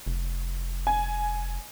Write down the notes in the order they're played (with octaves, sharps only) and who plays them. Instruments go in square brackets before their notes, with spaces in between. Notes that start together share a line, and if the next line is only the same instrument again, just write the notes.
[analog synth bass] F1
[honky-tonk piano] G#5